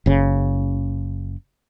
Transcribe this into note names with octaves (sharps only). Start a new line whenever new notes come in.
F#1 C#3